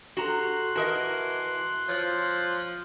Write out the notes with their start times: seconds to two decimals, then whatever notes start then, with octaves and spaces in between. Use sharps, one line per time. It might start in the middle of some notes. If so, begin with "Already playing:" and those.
0.17 F#4 G4 A4 A#5 C6 F#6
0.75 E3 F#4 A#4 D#5 A5 A#5
1.89 F3 C#5 G6